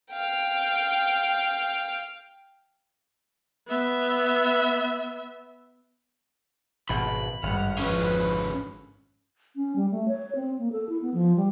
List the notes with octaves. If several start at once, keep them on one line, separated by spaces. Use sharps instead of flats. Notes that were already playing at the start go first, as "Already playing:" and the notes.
F5 G5
B3 E5
G#1 B2 B5
G#1 G2 F#5 F6
F2 D3 C#4 B4
C#4
G3
A3
C#5
C4
A#3
A4
E4
B3
F3
G3